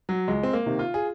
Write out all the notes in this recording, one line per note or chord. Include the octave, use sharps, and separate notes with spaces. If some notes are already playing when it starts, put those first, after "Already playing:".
F#3
C#2 G#3
C4
A#3
C3 D#3
F4
G#4